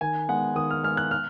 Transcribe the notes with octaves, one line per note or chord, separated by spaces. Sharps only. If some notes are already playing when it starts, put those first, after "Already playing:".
D#3 G#5
G#3 B3 F#5
D#3 D#6
F6
G#3 B3 F6
F#6
F6